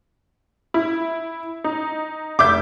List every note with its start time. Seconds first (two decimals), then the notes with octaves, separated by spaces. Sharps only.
0.74 E4
1.64 D#4
2.39 F1 E5 D6 G6